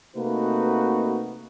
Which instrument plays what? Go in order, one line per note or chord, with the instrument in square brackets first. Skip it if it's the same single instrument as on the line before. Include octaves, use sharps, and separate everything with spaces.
[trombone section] C3 A3 A#3 D#4 F#4 B4